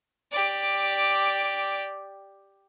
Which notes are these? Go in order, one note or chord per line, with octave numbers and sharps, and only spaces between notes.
G4 D5